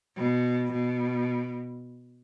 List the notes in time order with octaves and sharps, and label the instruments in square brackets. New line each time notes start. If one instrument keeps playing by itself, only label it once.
[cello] B2
B2